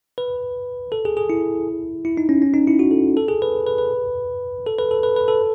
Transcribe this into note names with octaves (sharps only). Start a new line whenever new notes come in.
B4
A4
G#4
G#4
E4
E4
D#4
C#4
C#4
D#4
E4
F#4
A4
A4
G#4
B4
B4
B4
A4
B4
A4
B4
B4
A4